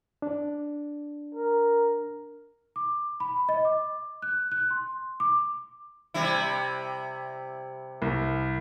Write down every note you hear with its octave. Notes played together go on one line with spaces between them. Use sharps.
D4
A#4
D6
B5
D#5
D6
F#6
F#6
C6
D6
C3 G3 E4
C2